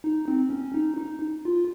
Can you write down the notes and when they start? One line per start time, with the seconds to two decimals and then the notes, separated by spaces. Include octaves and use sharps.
0.04 D#4
0.28 C4
0.50 C#4
0.74 D#4
0.97 D#4
1.45 F4